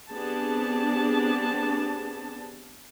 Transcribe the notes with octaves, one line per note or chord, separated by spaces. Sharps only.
B3 C4 D4 G4 G#4 A5